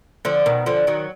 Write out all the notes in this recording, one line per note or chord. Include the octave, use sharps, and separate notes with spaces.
D3 F3
B2 D#3
D3 F3
D#3 F#3